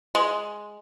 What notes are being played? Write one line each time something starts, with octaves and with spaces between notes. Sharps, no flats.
G#3